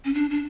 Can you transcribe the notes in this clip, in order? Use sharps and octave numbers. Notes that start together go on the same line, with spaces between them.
C#4
D4
D4